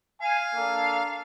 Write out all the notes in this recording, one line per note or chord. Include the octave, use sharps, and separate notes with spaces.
F5 G#5
A#3 D4 A4